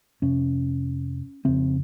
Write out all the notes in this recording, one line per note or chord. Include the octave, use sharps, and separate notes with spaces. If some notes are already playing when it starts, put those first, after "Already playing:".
F2 C3 C#4
F2 C#3 C4